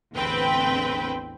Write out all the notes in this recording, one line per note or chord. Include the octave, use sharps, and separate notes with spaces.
A1 E2 D3 C4 B4 G5